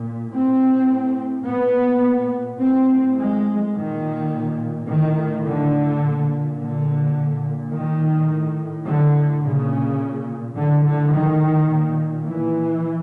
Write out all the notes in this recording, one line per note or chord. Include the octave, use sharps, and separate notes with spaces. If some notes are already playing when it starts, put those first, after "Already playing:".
Already playing: A#2
A2 C4
A#2 B3
A2 C4
G#3
A#2 D#3
A2 D#3
D3
A#2
D3
A#2
D#3
A2
D3
A#2 C#3
A2 D3
D3
D#3
A#2
E3